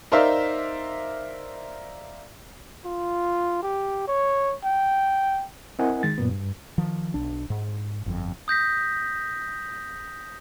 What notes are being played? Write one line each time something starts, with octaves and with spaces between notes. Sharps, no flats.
D#4 A#4 C5 D5 E5 F5
F4
G4
C#5
G5
C4 E4 A#4 D#5 F#5 G#5
D#3 G#3 A6
F#2 A#2 B3
G2
D#3 F3
B1 D4
G#2
G1 F2
D#6 G6 A#6 B6